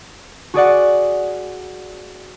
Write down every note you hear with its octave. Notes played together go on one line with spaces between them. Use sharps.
F#4 G#4 D5 F#5